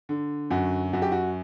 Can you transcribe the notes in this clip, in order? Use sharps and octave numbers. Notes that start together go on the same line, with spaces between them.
D3
F#2 F#4
F#2 F#4
G4
F#4